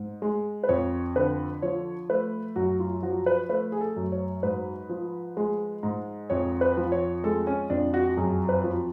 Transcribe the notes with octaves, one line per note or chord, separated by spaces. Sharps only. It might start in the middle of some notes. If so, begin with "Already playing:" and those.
Already playing: G#2
G#3
B4
F2 C#5
D3 B4
F3 C#5
A3 B4
F#2 F#4
F4
F3 F#4
B4
A3 B4
G#4
A4
F#2
C#5
G#2 B4
F3
G#3
G#2
F2 C#5
B4
F3
C#5
G#3 A4
C#4
F2 D4
F#4
F#2 G#4
B4
F3